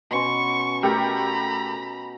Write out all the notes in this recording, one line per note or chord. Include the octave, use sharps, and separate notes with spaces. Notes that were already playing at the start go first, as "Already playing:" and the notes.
B2 C#4 C6 C#6
A3 G4 A#4 A#5 B5